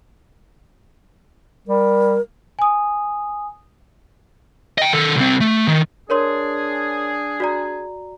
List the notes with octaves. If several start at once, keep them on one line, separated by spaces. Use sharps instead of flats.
G3 A#4
G#5 D#6
D#5 G5
D#3 A4
C2 C4
A3
D#3
D4 G#4 A#4 C#5 C6
F#4 D5 A#5